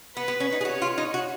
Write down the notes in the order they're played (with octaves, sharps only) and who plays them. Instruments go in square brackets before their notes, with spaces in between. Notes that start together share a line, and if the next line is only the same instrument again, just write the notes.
[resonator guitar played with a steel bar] B3 [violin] B4
[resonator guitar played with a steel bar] B3
C#4
D#4
G#4
[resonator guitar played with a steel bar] F#4 [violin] C#5
[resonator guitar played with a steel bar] F4
D#4
F#4